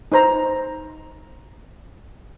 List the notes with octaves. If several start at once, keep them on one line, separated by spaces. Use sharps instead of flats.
D#4 B4 C5 A#5